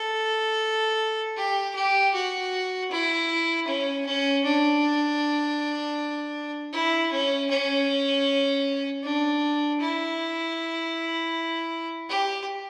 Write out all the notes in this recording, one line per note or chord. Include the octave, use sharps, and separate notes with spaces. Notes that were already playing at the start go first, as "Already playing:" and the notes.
Already playing: A4
G4
G4
F#4
E4
C#4
C#4
D4
E4
C#4
C#4
D4
E4
G4